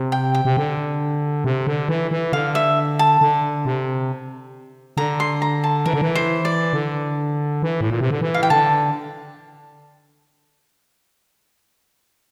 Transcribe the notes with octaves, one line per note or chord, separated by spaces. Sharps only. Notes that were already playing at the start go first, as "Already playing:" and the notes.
Already playing: C3
G5
G5
C3
D3
C3
D3
E3
E3
D3 F5
E5
A5
D3
C3
D3 A#5
C6
A#5
A5
E3 A#4
D3
E3
C5
D5
D3
E3
A2
A#2
C3
D3
E3
F5
G5
D3 A5